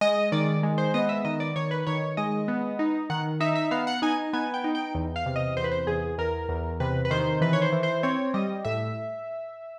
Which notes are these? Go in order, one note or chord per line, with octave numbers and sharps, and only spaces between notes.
G#3 D#5
D#3 D5
G#3
C5
B3 D#5
E5
D#3 D#5
D5
D#3 C#5
B4
D#3 C#5
G#3 D#5
B3
D#4
D#3 F#5
D#4 E5
E5
B3 F5
F#5
D#4 G#5
B3 G#5
G5
D#4
G5
E2
F5
C3
D#5
E2 C5
B4
C5
E2 G#4
E2 A#4
E2
C3 B4
B4
D#3 C5
E3 B4
C#5
C5
E3
C5
C4 C#5
G3 D#5
A2 E5